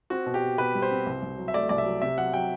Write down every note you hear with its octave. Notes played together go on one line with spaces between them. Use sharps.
C4 F#4
B2
G4
B2
B2 B4
G3
C5
C4
C2
C2
F#3
E5
A3 D5
C2 D5
E5
F#3
C3 E5
F#3 F#5
F#3 G5